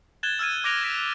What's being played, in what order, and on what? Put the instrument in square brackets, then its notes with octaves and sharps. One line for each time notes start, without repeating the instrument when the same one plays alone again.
[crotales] F#6 G#6 A6 E7 G7
E6 F6 G#6 D#7
D6 F#6 A#6 D7 F7 G7
G#6 B6 D7